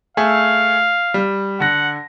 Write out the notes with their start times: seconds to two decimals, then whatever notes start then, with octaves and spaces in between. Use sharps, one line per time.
0.17 A3 G#4 E5 F5
1.14 G3
1.60 D3 F#5 A#6